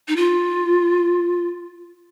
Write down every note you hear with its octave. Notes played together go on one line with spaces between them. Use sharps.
D#4
F4